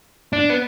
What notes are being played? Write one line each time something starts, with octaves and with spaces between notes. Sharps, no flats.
D4
B3